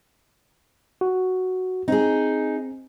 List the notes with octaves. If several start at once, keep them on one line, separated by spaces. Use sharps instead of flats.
F#4
C4 D#4 G#4